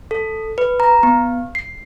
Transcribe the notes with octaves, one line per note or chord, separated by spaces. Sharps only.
A4
B4
A#5
B3
C7